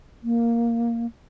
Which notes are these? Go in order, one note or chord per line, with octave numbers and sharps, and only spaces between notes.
A#3